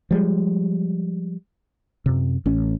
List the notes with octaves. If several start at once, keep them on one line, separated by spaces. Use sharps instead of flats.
F3 G3 G#3
F#2 C3
A1 C#4